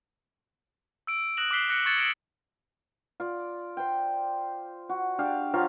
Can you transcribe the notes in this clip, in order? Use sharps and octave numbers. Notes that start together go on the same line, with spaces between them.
E6 D7
D#6 F#6 A#6 E7 F#7
D6 F6 F#6 B6 C7 G7
D6 F#6 A#6 C#7
C#6 G#6 A6 C#7 E7
E6 A#6 C#7 D7 E7 F#7
F4 D5
C5 G5
F#4
D4 G4 F5
F3 F#3 F4 F5